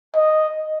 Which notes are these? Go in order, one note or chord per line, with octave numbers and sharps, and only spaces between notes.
D#5